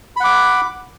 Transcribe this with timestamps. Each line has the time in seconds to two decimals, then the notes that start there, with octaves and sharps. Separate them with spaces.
0.16 B5
0.20 F#5
0.24 D6